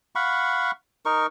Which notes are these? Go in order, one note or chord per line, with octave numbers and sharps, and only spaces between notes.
F5 F#5 B5 C#6
D#4 A#4 C#6